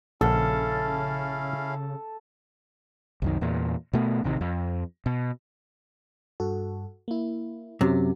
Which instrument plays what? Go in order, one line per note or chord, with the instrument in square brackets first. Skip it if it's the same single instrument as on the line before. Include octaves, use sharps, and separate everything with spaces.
[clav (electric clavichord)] A#1 F#5 [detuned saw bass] C#3 [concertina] C#4 E4 F5 [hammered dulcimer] A4
[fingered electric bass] C2 F#2 D#3
E2 A#2
B2 A3 B3
A1 C3 D#3
F2
B2
[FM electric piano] G2 F#4 A4
A#3 E4
[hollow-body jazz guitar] F#2 C3 [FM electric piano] C#4